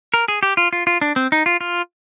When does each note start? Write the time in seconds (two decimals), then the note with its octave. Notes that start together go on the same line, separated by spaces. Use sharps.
0.14 A#4
0.28 G#4
0.43 G4
0.57 F4
0.73 F4
0.87 F4
1.01 D4
1.16 C4
1.32 D#4
1.46 F4
1.61 F4